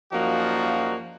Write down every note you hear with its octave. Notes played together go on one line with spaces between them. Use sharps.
F#2 F3 G3 A#3 D#4 F#4